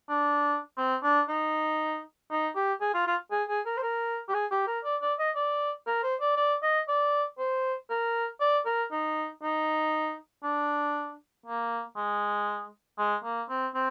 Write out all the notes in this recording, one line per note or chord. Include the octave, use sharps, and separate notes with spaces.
D4
C4
D4
D#4
D#4
G4
G#4
F4
F4
G#4
G#4
A#4
C5
A#4
G4
G#4
G4
A#4
D5
D5
D#5
D5
A#4
C5
D5
D5
D#5
D5
C5
A#4
D5
A#4
D#4
D#4
D4
A#3
G#3
G#3
A#3
C4
C4